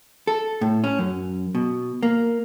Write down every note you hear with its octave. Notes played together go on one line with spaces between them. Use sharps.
A4
A2
C#4
F#2
B2
A#3